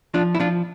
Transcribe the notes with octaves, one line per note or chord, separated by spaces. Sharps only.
F3 D4 F4
E4
F3 D4 F4